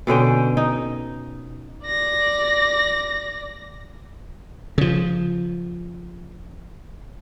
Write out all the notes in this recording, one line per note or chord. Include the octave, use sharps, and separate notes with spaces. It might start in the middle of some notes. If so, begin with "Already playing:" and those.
B2 D3 C#4 G5
D#4
D5 A#6
C#3 F3